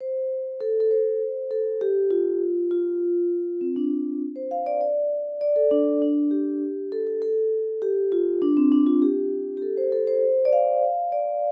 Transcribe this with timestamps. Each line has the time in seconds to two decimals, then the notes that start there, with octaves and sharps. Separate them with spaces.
0.01 C5
0.61 A4
0.80 A4
0.91 C5
1.51 A4
1.81 G4
2.11 F4
2.71 F4
3.61 C4
3.76 D4
4.36 C5
4.51 F5
4.66 D5
4.81 D5
5.41 D5
5.56 A4
5.71 D4
6.02 D4
6.31 G4
6.92 A4
7.07 A4
7.22 A4
7.82 G4
8.12 F4
8.42 D4
8.57 C4
8.72 D4
8.87 F4
9.02 G4
9.57 G4
9.62 A4
9.77 C5
9.92 A4
10.07 C5
10.45 D5
10.53 F5
11.12 D5